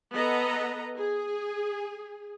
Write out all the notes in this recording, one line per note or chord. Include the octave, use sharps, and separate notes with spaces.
B3 A4 B4 D#5 A#5
G#4